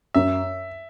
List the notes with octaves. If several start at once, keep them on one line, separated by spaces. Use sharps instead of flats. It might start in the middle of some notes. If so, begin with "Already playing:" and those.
F#2 E5